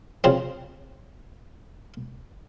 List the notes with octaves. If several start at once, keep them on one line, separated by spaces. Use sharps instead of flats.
C#3 F3 C4